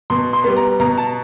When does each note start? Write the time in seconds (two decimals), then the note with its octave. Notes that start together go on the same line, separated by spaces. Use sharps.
0.10 B2 C6
0.33 C6
0.44 G3 B3
0.57 A#5
0.80 B2 A#5
0.98 A5